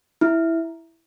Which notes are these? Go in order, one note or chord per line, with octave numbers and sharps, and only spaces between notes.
E4